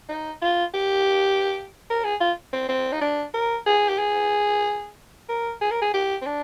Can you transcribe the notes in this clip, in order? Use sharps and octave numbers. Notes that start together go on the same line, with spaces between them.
D#4
F4
G4
A#4
G#4
F4
C4
C4
D#4
D4
A#4
G#4
G4
G#4
A#4
G#4
A#4
G#4
G4
C4
D4